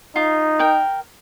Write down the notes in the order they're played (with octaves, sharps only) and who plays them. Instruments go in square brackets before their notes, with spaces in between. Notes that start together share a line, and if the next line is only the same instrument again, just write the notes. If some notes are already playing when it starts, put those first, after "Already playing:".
[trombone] D#4 [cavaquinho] F4
[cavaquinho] A#4 G5